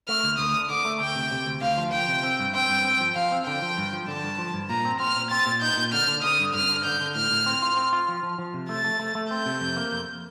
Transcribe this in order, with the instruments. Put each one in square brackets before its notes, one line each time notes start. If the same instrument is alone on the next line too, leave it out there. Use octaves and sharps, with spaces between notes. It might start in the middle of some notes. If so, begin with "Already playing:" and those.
[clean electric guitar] A3 [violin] F6
[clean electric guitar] D2
[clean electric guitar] D2 [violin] D#6
[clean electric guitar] D3
[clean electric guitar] D3 [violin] D6
[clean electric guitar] A3
[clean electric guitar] D2 [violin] G5
[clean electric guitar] C3
C3
D2
[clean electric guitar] D2 [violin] F5
[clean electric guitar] F3
[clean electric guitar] F3 [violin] G5
[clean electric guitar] C3
C4
G2
[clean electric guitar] C4 [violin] G5
[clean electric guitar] G2
C4
F3
[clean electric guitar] F3 [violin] F5
[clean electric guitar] C4
[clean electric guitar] D3 [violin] G5
[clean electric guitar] F3
G2
F3
[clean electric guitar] D3 [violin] A5
[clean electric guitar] G2
F3
G2
[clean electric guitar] A#2 [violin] A#5
[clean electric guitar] C4
[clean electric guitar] C4 [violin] F6
[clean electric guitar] A#2
[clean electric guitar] C4 [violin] A6
[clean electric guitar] A#2
[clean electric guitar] D#4 [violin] G6
[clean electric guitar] A#2
[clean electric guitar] D3 [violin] F6
[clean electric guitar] D3
[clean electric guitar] D3 [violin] D#6
[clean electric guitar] G2
[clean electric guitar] G2 [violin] F6
[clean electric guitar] D3
[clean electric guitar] D3 [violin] G6
[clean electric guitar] D3
[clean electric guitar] A2 [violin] F6
[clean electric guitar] A2
C4
F4
C4
F4
F3
F3
F3
C3
[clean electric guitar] A3 [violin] A6
[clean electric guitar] A3
A3
A3
[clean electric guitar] C4 [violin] G6
[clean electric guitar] C3
F2
A#3
F2